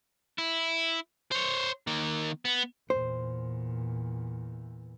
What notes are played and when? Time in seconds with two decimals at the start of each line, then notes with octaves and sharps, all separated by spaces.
0.38 E4
1.32 C5 C#5
1.87 D#3 A#3
2.45 B3
2.90 E2 A#2 C5